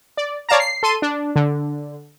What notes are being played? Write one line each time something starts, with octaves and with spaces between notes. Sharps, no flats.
D5
C#5 D5 F5 A5 A#5
C7
A4 C6 D#7
D4
D3